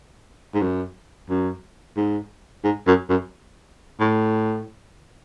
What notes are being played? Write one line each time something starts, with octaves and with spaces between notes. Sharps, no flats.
G#2
F#2
F#2
G#2
G#2
F#2
F#2
A2